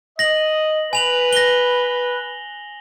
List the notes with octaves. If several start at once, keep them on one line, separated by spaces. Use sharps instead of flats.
D#5 A#6 F#7
B4 G#5 F7 F#7
A#6 G7